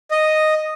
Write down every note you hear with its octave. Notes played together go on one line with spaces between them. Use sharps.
D#5